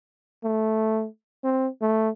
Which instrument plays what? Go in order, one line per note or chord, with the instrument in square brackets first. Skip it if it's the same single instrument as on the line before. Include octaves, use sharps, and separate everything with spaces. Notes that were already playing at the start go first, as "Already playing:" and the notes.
[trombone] A3
C4
A3